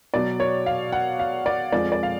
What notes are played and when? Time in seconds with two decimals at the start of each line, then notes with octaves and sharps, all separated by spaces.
0.14 B2 F#3 D5
0.40 C#5
0.66 F5
0.92 F#5
1.19 F5
1.46 D5
1.72 F2 F3 G#3 D5
1.92 D5
2.03 F5